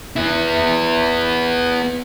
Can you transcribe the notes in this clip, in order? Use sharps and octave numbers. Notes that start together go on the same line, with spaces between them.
B3 E4